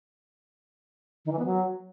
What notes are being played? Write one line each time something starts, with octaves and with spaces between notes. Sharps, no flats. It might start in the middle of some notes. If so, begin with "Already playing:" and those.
D#3
E3
B3
F#3